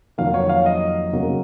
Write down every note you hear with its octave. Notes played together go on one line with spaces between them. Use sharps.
F2 D#3 F#3 A#3 F5
C#5
F5
D#5
F#2 C#3 F#3 A#3